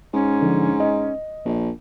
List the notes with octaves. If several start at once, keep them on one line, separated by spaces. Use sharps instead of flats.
G#2 C#4
D3 F3 D4
D#5
A#1